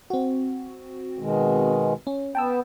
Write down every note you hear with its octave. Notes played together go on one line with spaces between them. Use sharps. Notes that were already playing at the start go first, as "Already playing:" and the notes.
C4 F#4
B2 D#3 G#3
C#4
B3 G5 A5 E6